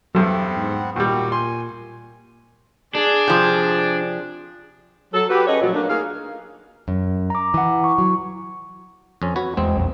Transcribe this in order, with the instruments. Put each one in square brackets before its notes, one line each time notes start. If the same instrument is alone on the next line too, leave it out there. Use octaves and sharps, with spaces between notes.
[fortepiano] E2 G2 A4 [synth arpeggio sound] F#3 [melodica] B3 C4 F#5
[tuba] G#2
[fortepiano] D#2 G3 [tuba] A#2 [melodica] F#4 F#5
[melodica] G#5 [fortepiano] C6
[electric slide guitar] D4 [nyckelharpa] G#4 D5
[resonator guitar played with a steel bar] C3 F3
[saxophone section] F#3 A4
F#4 G4 B4
C#4 G#4 A4 B4 C#5 D#5
A#2 F3 F#3
F#3 A3 A#3 C#4 D4
A#3 D#4 G#4 F5
[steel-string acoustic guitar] F#2
[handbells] A#5 D6
[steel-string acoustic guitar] E3 [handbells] F#5 D6
[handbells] C#6
[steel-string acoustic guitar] F#3
[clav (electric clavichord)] F2 C#4
F#4 B4 C#5
[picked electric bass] E2 G#3 [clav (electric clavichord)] C4
[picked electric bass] B1 F2